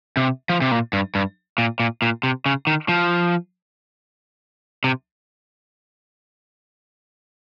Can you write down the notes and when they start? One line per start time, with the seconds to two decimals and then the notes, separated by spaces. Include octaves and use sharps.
0.17 C3
0.49 F3
0.61 C3
0.71 A#2
0.93 G2
1.15 G2
1.58 A#2
1.80 A#2
2.02 A#2
2.23 C3
2.46 C#3
2.67 D#3
2.89 F3
4.84 C3